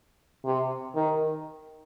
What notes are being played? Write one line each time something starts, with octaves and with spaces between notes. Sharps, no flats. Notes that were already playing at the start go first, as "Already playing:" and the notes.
C3
D#3